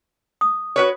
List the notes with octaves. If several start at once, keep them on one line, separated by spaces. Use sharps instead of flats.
D#6
F#4 B4 C#5